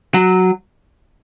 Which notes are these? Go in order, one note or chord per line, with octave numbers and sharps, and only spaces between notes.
F#3